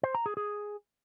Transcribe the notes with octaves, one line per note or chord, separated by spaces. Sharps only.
C5
A#5
G#4
G#4